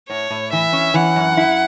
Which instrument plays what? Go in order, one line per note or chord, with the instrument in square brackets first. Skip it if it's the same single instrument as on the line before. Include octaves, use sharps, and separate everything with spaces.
[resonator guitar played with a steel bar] A2 [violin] C#5
[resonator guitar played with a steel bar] A2
[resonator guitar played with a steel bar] E3 [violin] E5
[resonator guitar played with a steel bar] C#4
[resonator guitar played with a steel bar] E3 [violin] F#5
[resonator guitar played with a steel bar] F#2
E4